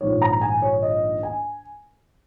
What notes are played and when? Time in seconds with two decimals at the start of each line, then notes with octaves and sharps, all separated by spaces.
0.01 A#1 G#2 D#3 C#5
0.22 A#5
0.41 G#5
0.62 C#5
0.82 D#5
1.23 G#5